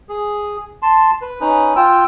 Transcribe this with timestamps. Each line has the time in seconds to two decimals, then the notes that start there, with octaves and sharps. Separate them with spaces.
0.09 G#4
0.82 A5 C6
1.22 B4
1.41 C#4 D#4 B4
1.76 F4 G5 E6